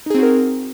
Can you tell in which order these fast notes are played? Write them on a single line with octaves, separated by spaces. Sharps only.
D#4 G#4 C4 F#4 A#4